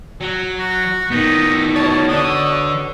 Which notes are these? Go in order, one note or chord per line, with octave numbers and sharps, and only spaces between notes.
F#3
F#4
D#3 B3 D#4
B2 C#5 A5
D3 D#6